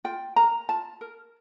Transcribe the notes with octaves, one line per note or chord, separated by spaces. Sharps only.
F4 G5
A#4 A#5
F4 A5
A#4